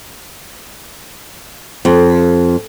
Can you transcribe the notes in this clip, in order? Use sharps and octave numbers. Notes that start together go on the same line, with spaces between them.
F2